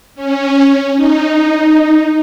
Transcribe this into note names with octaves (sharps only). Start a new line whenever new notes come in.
C#4
D#4